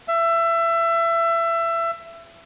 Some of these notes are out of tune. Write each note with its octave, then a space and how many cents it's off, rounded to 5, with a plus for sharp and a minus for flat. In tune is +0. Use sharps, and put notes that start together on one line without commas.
E5 +25